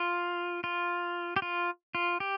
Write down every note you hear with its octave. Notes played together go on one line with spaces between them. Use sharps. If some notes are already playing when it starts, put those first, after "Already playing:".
Already playing: F4
F4
G4
F4
F4
G4